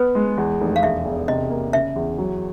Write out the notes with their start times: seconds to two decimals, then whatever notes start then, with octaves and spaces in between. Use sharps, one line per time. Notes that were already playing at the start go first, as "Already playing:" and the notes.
Already playing: B3 B4
0.15 G#3
0.37 E2
0.61 F1
0.76 F5
0.83 E1 E5
1.05 E1
1.28 C3 D#5
1.50 A#3
1.73 C#3 E5
1.96 E2
2.18 F#3